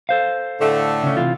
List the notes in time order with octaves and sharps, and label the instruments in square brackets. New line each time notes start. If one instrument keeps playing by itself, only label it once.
[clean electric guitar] A4 C5 F5
[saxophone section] A2 D3 A3
[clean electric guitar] C#3 C#4
C3 E3 F4